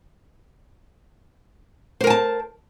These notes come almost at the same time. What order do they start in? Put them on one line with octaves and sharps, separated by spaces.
C5 A#4 G#5 A5